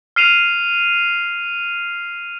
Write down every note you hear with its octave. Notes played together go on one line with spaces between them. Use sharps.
F6 C7 D#7 F7